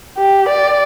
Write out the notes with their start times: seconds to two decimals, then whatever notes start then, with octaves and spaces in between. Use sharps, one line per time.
0.18 G4
0.49 D5